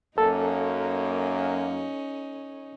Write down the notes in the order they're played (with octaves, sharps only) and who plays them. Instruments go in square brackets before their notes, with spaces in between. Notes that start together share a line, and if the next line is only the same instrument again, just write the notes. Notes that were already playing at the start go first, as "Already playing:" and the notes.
[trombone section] F#2 A#3 [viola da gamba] C#4 D#4 [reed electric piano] A4